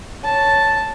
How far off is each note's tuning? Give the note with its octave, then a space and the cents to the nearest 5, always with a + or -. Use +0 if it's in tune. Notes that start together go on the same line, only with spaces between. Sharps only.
C#5 +0 A5 +0